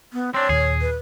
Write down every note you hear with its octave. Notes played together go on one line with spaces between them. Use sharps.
B3
C4 D4 C#5
D#2 A#2 G#4
B4